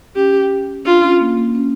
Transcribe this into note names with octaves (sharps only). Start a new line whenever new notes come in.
C#4 G4
D4 F4
C#4
A#3
A#3
C#4